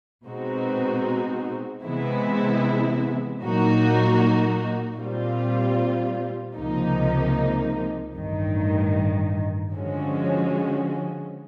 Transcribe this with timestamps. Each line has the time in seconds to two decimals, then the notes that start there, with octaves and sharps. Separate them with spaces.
0.25 B2 G#3 C4 D#4 F#4
1.83 C3 E3 G#3 B3 E4
3.41 A#2 F#3 A#3 D#4 F#4
4.98 A#2 G3 C4 F4
6.56 C#2 C3 F3 A#3 D#4
8.14 A1 G2 D#3
9.71 D3 F3 G#3 C#4 F#4